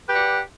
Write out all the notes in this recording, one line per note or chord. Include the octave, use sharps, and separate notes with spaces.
G4 B4 D5 F#5